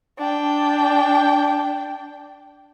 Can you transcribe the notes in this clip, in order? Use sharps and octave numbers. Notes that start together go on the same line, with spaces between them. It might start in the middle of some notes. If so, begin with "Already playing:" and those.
D4 G5